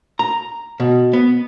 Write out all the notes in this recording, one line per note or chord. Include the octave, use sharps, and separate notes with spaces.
A#5
B2
B3